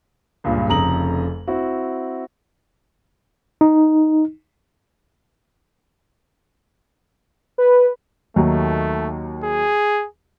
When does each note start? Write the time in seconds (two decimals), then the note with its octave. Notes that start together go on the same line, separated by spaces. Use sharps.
0.44 C#2 G2 A#2
0.69 F1 F2 C#3 A#5 D#6 F#7
1.48 C4 E4 F#4
3.61 D#4
7.58 B4
8.36 D#2 D#3 F#3 A3
9.44 G#4